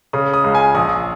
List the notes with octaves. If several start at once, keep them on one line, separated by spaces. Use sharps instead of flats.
C#3 D#6
D#6
C#2
G#5
A#1 D#6